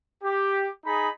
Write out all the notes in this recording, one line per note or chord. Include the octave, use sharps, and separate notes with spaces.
G4
D#4 G#4 B5